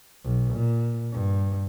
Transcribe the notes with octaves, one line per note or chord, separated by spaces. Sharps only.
B1
A#2
G2